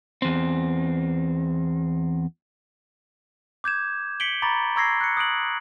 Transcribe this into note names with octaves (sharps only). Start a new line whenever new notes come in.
E2 C4
D6 G6 G#6 E7
B6 C#7 D7 F#7 G7
A#5 B5 C#6 D6 A6
A#5 C#6 E6 G#6 A#6 C7
F#6 C#7
D#6 F#6 D7 F#7